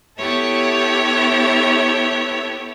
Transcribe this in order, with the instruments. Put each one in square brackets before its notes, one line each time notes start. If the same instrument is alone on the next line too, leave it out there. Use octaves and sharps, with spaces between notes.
[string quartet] B3 E4 G4 A4 C#5 E5